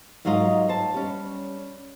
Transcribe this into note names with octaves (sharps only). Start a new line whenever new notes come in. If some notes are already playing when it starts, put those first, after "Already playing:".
G#2 F#3 F4 A#4 D#5 F5
C5 A5
G3 C#4